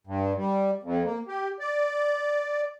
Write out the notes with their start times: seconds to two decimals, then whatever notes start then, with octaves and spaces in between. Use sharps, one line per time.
0.07 G2
0.37 G3
0.83 F2
1.05 A#3
1.28 G4
1.59 D5